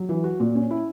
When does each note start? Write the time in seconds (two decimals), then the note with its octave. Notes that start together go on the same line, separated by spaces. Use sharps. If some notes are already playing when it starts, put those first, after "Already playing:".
Already playing: F#3
0.09 E3
0.24 F#4
0.40 A#2
0.55 C#4
0.71 E4